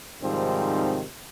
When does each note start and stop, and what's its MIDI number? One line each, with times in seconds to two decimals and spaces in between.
0.22 1.04 44
0.22 1.04 48
0.22 1.04 51
0.22 1.04 53
0.22 1.04 55
0.22 1.04 60